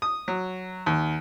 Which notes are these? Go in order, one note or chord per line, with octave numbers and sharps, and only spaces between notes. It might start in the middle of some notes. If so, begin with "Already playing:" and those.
D#6
F#3
D#2